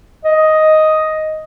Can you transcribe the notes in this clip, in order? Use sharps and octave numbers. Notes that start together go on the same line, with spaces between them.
D#5